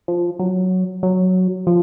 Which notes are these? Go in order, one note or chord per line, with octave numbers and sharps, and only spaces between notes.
F3
F#3
F#3
F3